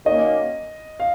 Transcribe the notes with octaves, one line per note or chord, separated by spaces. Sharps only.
D#3 F#3 A#3 C#4 D#5
F5